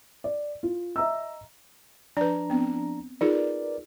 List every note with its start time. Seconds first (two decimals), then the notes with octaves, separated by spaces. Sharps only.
0.24 D5
0.63 F4
0.96 D#5 E5 A#5 E6
2.17 F3 D4 B4 D5 A#5
2.50 B3 C4
3.21 D#4 F4 G#4 A#4 B4 D5